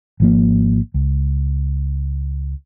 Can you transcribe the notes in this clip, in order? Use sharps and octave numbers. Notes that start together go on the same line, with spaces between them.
G#1 F3 A#3
C#2